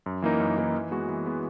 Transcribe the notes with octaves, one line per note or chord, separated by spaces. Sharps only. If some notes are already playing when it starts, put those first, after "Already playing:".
F#2
E3 A#3 D#4 A#4
F#2
E3 A#3 D#4 A#4
E3
G#3 B3 F#4
E3
G#3 B3 F#4